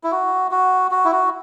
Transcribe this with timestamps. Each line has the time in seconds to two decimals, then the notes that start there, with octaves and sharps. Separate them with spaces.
0.04 E4
0.12 F#4
0.51 F#4
0.91 F#4
1.05 E4
1.12 F#4